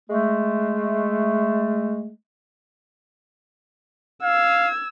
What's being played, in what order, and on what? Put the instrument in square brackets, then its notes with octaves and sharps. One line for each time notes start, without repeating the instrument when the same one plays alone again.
[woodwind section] G#3 A3
[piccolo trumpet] F5 [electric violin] E6 G#6